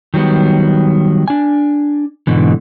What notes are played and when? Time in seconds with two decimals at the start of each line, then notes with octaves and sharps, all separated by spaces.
0.14 D#3 F#3 G3 B3
1.28 D4 G#5
2.27 G#2 B2 D3 E3